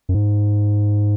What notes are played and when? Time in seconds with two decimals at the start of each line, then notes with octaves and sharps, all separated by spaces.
0.09 F#2
0.14 G#2